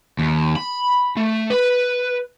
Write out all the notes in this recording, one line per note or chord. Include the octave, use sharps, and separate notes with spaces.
D#2
B5
A3
B4